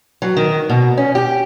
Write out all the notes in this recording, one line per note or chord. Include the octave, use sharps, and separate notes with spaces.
F#3
D#3
B2
C#4
G4